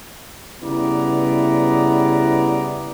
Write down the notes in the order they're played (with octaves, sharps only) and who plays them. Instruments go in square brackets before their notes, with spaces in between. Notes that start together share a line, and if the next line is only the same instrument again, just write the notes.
[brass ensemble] C#3 G3 B3 E4 D5 A#5